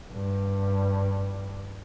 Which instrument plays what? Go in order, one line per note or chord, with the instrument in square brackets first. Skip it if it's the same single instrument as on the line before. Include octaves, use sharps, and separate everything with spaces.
[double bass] G2 G3